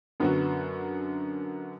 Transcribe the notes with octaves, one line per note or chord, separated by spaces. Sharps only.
F#2 D3 F#3 B3 F#4